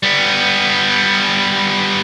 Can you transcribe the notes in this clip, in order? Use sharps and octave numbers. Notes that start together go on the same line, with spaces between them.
G3 B3